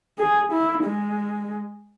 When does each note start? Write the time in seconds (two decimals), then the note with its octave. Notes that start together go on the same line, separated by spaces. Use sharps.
0.18 G#4
0.52 E4
0.84 G#3